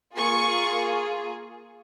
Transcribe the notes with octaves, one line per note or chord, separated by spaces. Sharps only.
A#3 F4 G#4 C#6